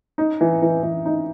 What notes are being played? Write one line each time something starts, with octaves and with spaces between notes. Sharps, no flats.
D#4
E3
E3
E3
D#4